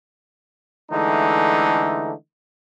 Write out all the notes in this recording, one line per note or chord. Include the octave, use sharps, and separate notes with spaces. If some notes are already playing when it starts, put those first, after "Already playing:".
D3 E3 G#3 A3 D#4